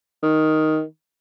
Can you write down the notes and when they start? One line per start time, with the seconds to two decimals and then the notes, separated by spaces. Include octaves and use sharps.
0.23 D#3